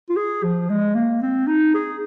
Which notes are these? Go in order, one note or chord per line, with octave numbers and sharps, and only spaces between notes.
F4
G#4
F3
G#3
A#3
C4
D#4
G#4